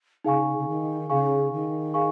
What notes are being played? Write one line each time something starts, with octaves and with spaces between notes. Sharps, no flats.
C#3 D#4 G#4 F5 G#5 C#6
C#3
D#3
C#3 D#4 G#4 F5 G#5 C#6
D#3
D#4 G#4 F5 G#5 C#6